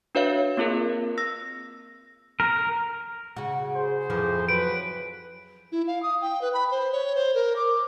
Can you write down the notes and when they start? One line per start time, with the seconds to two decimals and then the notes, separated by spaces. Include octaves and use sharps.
0.15 D4 F#4 B4 C#5 E5 F5
0.57 A#3 C4 F4 G#4 A#4
1.18 E6 A#6
2.40 A#4
3.37 C#3 F#4
3.76 G#4 C5
4.10 F2 E3 F3
4.49 F#3 B4 D7
5.72 E4
5.87 F5
6.03 D#6
6.22 G5
6.41 B4
6.54 B5
6.71 C5
6.92 C#5
7.15 C5
7.34 A#4
7.56 D6